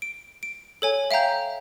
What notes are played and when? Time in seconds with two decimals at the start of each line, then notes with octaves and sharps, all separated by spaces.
0.02 D7
0.43 D7
0.82 A4 C#5 G#5
1.11 E5 F5 G5 A#5 G6